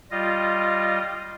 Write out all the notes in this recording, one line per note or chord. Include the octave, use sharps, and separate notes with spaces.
G3 F4 D#5